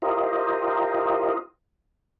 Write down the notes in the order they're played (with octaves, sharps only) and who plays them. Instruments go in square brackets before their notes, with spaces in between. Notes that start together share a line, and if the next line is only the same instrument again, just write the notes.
[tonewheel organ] E4 F4 G4 A#4 C5 D#5